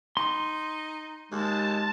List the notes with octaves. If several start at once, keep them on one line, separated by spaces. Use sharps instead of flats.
D#4 C6
D#2 G#3 A5